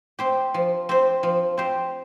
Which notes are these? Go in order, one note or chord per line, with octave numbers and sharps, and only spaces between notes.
C4 G4 C5
F3
C4 G4 C5
F3
C4 G4 C5